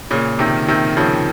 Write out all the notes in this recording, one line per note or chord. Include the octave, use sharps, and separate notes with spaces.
A#2 C#3
C3 D#3
C3 D#3
C#3 F3